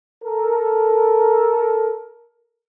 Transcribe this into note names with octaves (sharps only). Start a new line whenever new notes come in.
A4 A#4